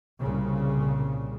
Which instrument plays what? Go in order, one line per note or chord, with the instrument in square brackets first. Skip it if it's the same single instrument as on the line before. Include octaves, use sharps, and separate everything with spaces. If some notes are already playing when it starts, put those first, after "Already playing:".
[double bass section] C2 A#2 C#3